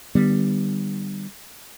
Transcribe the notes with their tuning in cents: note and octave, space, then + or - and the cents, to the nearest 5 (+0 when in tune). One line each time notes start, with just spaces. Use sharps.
D3 +40 G3 +0 B3 +0